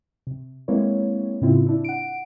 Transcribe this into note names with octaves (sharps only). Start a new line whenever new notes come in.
C3
G#3 A#3 C4 E4 B4 C#5
A2 C#3 C4 E4 F4
D4 E4
F#5 D7